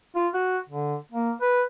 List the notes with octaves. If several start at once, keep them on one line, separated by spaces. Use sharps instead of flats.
F4
F#4
D3
A#3
B4